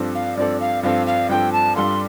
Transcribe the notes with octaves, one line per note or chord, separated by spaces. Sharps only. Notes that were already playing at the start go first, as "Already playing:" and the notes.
Already playing: G2 F3 C4 A4
F5
G2 F3 C4 A4 D5
F5
G2 F3 C4 A4 F5
F5
G2 F3 C4 A4 G5
A5
G2 G3 F4 A4 C6